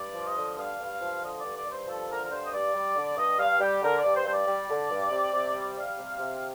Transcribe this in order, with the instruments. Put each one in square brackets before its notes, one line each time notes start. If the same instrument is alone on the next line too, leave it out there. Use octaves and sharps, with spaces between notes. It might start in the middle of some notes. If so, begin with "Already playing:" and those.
Already playing: [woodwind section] G2 D5
F3
D#5
D3
G2 F5
G2
F3
D3 D#5
D5
G2
D5
G2 C5
F3 A4
D3 A#4
A#4
G2 C5
D#5
G2 D5
G3
D3
G2 D#5
G2 F5
G3 G4
D3 A#4
D5
G2
C5
G2 C5
D5
G3
D3
G2
C3
C3
G3
G3 F5
C3
C3